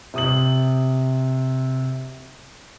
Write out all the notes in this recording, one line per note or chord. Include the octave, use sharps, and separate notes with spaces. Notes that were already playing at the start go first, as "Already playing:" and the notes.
C3 D#6 F#7